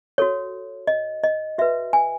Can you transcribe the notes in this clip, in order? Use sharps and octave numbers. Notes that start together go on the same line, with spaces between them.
F#4 A4 C#5
D#5
D#5
F#4 B4 E5
G#5